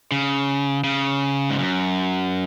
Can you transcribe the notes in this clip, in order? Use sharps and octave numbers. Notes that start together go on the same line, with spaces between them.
C#3
C#3
G#2
F#2